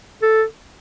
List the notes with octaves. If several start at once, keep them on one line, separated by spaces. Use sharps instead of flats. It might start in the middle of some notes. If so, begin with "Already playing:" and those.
A4